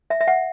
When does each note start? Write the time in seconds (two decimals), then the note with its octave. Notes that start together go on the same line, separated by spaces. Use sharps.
0.10 E5
0.21 E5
0.28 F#5